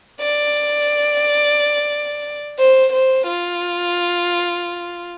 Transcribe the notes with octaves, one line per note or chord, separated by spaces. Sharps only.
D5
C5
C5
F4